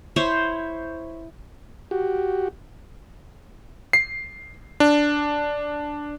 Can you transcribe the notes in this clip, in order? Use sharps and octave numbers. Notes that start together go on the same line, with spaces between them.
E4 C5 C#5
F#4 G4
C7
D4